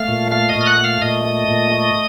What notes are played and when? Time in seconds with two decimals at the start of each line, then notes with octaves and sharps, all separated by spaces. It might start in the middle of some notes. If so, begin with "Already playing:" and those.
Already playing: A3 F5 F6
0.08 A#2
0.31 A3 F5 F6
0.49 D#5 D#6
0.56 A#2
0.61 F6
0.66 F#5 F#6
0.78 A3
0.84 F5 F6
1.01 A#2 D#5 D#6
1.25 A3
1.48 A#2
1.72 A3